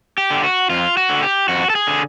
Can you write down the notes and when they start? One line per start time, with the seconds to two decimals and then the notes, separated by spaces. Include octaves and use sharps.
0.18 G4
0.31 D3
0.44 F#4
0.70 F2 F4
0.97 F#4
1.10 D3
1.23 G4
1.48 F2 F#4
1.70 A4
1.75 G#4
1.87 D3